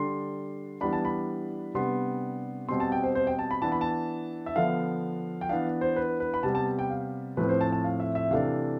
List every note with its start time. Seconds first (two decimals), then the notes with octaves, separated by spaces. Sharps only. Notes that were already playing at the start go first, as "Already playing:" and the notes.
Already playing: D3 G3 D4 C6
0.81 E3 G3 B3 D4 B5
0.93 A5
1.05 B5
1.74 C3 G3 B3 D4 C6
2.69 B2 G3 C4 C6
2.80 A5
2.92 G5
3.03 C5
3.15 C5
3.27 G5
3.39 A5
3.51 B5
3.62 E3 B3 D4 A5
3.72 B5
3.81 A5
4.46 E5
4.56 D3 F3 B3 D4 F5
5.41 G5
5.49 E3 B3 D4 F5
5.81 C5
5.96 B4
6.20 B4
6.34 B5
6.43 C3 G3 B3 A5
6.55 A5
6.79 G5
6.90 F5
7.37 A2 F3 C4 B4
7.49 C5
7.61 A5
7.72 A5
7.84 F5
8.00 E5
8.15 E5
8.31 C3 E3 A3 D4 F5